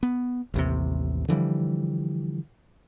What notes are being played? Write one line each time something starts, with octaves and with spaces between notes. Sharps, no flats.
B3
A1 D#2 C3
D3 E3 F3 G3